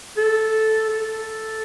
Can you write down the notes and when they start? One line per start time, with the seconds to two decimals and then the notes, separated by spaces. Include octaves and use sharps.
0.17 A4
0.89 A4